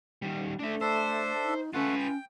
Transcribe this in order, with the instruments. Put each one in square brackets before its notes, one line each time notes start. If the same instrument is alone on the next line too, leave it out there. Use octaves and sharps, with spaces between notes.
[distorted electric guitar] D#3 G3
[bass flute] A3 [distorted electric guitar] D4 E5
[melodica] D4 A4 E5 [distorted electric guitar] C5
[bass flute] D#4
[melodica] A3 F#5 [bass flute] C#4 [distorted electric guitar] F4 B4
[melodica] G5